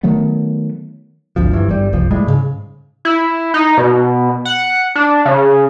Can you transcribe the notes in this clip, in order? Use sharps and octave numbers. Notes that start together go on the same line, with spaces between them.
D#3 F#3 A3 B3
D1 G#1 D2 F3
F#1 G2 E3
G1 G3
F#1 C2 F3
A2 G3 G#3
G#2 C#3
E4
D#4
B2
F#5
D4
C#3